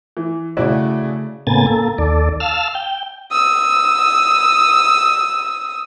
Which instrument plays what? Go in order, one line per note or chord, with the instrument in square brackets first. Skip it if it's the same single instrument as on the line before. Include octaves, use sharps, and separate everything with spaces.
[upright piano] E3
[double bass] C#3 A3 [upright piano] E4 F#4 D5
[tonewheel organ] A2 C#3 A#3 B3 G#5 A6
A#3 A4
D#2 A4 D5
F5 A5 E6 F6
G5
[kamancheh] D#6 E6